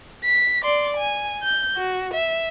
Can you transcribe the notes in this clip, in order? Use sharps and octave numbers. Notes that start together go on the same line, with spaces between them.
B6
D5 C6
G#5
G6
F#4
E5